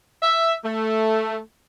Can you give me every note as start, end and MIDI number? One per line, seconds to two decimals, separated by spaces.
0.22 0.54 76
0.63 1.38 57